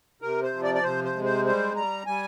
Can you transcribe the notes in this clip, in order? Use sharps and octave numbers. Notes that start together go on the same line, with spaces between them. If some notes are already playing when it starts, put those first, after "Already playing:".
C3 A#4
C5
F3
D5
D5
C3 C5
C5
G#3
C5
G3 C5
G3 A#5
G3 G#5